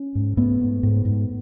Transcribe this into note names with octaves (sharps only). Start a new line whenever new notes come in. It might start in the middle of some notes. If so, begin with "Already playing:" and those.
Already playing: C#4
G#2
G#2 A3 B3
G#2
G#2
G#2